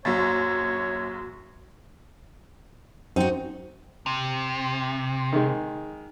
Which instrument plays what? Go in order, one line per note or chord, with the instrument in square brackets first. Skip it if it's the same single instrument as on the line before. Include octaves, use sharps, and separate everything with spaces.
[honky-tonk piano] A#1 F#2 [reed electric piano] F#4 C6 A6 [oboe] C#5
[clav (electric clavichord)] F#2 [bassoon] C4 [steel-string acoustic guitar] D#4 F#4
[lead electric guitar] C3
[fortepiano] D#3 G#3